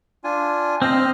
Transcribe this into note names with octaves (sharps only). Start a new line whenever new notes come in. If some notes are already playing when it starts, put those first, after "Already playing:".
D4 F4 G#5
C4 C5 D#5 F6